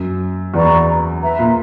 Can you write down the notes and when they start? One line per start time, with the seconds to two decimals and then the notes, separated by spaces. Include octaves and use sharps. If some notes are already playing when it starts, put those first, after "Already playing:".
Already playing: F#2
0.53 E2 B4 D5 A#5 C#6
1.21 B4 E5 A#5
1.39 A#2